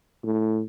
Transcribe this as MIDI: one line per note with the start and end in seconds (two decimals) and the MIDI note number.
0.24 0.63 45